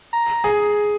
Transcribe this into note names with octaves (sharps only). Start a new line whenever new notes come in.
A#5
G#4